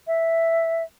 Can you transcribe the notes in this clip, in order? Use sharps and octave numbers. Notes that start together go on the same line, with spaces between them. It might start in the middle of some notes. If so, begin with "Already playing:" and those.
E5